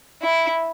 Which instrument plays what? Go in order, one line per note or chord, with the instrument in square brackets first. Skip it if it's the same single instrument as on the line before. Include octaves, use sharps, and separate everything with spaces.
[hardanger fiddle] E4